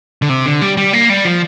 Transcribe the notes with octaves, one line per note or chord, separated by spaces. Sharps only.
D3
C3
D3
G3
G3
A#3
G3
F3